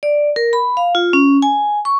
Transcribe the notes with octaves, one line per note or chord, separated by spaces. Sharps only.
D5
A#4
B5
F5
F4
C#4
G#5
C#6